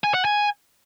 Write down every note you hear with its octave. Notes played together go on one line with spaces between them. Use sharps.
G#5
F#5
G#5